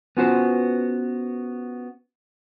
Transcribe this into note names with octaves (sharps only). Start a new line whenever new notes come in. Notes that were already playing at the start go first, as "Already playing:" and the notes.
B3 C#4 F4 F#4 B4 C5